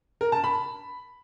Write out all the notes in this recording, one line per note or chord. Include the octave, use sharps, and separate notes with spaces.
A#4
A5
B5